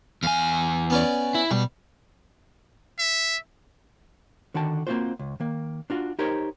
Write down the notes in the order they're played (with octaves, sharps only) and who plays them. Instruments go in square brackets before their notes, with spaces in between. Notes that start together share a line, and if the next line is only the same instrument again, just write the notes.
[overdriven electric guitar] E2 G#5 [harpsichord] F5
[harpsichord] B3 C#4 D5
[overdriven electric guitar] E4
[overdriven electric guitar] B2 [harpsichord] G3
[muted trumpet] E5
[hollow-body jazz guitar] D3 D#3 F#4 G5 A5
A#3 C4 D4 F4 F#4 C5
C#2
D#3 A#3
D4 F4 F#4
D#4 G4 A#4 C5 C#5